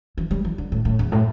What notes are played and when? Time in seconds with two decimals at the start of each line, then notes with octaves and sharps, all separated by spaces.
0.18 E3
0.31 G3
0.45 E3
0.58 D3
0.72 A2
0.85 A2
0.99 E2
1.12 A2